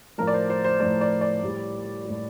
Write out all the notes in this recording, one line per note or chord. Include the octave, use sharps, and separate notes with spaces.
A2 F3 A3 A#4
D5
C5
C5
C5
A2 F3 A3 D5
D5
D5
A2 G3
G3
A2